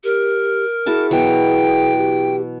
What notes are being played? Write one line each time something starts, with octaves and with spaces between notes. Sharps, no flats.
G4 A#4
E4 F#4 G#4 A5
B2 E3 F#3 G5
G4